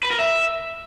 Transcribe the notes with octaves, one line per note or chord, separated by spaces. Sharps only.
B4
A#4
E5